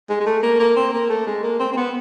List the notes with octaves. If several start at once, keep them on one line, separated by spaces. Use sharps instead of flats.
G#3
G#3
A3
A#3
A#3
C4
A#3
A3
G#3
A#3
C4
C4
B3